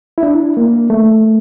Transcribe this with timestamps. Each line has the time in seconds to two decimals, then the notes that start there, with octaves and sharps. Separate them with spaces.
0.18 E4
0.23 D4
0.57 A#3
0.90 A3